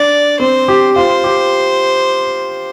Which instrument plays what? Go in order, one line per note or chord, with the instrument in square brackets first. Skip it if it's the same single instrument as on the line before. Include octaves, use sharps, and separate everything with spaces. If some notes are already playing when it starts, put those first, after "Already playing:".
Already playing: [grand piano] D4 [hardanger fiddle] D5
[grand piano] C4 [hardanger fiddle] C5
[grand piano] G4
[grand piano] F4 [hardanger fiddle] C5
[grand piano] G4